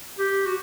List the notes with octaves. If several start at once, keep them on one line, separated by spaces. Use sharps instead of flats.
G4
F#4